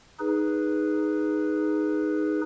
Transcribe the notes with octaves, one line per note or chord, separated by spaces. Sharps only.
D#4 G#4 B4